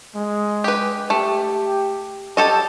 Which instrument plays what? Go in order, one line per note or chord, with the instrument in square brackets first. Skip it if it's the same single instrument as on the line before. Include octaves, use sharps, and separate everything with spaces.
[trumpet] G#3
[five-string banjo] G4 B4
[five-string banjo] A3 [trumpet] G4
[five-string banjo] G4 A4 D#5 [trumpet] A5